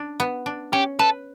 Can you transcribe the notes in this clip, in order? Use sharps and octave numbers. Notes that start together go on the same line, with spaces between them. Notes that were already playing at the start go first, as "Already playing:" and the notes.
Already playing: D4
B3
D4
C#4 G4
A4 B4